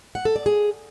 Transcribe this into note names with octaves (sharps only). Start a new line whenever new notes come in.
F#5
A4
D5
G#4